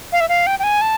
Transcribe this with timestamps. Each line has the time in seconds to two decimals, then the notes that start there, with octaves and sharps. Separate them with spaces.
0.12 F5
0.21 E5
0.29 F5
0.47 G5
0.59 G5
0.64 G#5
0.81 A5